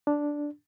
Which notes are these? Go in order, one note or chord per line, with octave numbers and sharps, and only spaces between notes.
D4